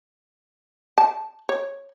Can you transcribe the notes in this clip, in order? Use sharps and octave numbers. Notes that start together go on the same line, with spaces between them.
A5
C#5